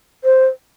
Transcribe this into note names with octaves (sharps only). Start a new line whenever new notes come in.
C5